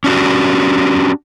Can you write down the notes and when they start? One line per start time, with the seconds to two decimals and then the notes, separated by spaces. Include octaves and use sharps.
0.04 C#4 D4 F#4 G4